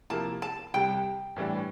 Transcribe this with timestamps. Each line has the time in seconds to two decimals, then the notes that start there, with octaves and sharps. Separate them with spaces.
0.10 C3 F3 A#3 E4 A5
0.42 A5
0.74 C2 C3 G3 G5
1.36 A2 E3 G3 D4